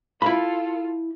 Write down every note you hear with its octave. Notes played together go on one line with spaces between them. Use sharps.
E4 F4 A4 B5